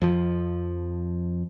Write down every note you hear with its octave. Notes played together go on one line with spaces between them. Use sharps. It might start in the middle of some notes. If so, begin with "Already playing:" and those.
F2 F3